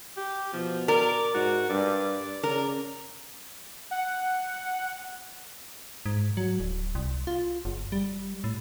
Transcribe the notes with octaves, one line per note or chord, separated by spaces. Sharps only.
G4
B2 F3
A#4 D5
G#2 F#4
G2 D5
C#3 A#4
F#5
G#2
F#3
D1
C2
F4
F#1
G3
A2